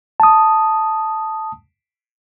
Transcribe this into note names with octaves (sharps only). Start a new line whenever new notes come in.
A5 D#6